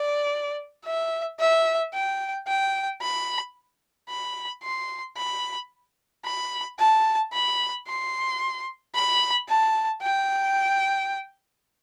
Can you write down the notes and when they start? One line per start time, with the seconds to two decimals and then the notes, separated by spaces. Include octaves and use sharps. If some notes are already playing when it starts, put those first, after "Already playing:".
Already playing: D5
0.85 E5
1.39 E5
1.94 G5
2.47 G5
3.01 B5
4.09 B5
4.62 C6
5.17 B5
6.25 B5
6.79 A5
7.33 B5
7.87 C6
8.95 B5
9.49 A5
10.02 G5